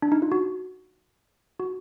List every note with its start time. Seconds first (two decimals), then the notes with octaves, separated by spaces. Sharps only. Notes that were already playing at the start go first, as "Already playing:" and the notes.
0.02 D4
0.12 D#4
0.22 F4
0.32 F#4
1.60 F#4